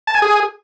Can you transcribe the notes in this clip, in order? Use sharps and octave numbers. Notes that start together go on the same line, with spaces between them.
A5
G#5
G#4